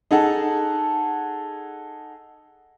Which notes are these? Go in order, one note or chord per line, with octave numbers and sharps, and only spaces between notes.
D#4 G#4 A4 F#5 A5